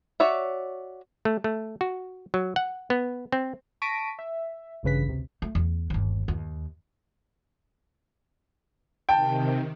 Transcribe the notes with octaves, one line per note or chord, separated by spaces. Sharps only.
F#4 C#5 D5 E5
A3
A3
F#4
F#3
F#5
B3
C4
A5 C#6 A#6 B6 D7 D#7
E5
A1 G2 C#3 B4 B6
D2 C3
A3
E2
G1 D#2
D#2
C3 D#3 G5 A5